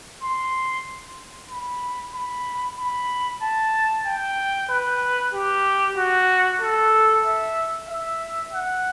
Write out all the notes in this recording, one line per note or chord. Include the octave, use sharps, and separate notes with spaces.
C6
B5
B5
B5
A5
G5
B4
G4
F#4
A4
E5
E5
F#5